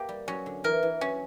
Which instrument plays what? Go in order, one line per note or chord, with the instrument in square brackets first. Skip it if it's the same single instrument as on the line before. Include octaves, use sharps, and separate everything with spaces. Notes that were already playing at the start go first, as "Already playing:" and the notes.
Already playing: [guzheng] A#3 [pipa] G4
[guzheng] G3
[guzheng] F#3 [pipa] C#4
[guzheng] D3
[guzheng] E3 [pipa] A#4
[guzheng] E3
[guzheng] F#3 [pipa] C#4